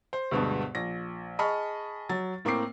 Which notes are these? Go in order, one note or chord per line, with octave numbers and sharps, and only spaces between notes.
C5
D2 G2 B2 G#3 B3
A#1 A#6
G#4 D#5 A5 B5 C#6 F6
F#3 A6
A2 A#3 C4 G5 D6 C7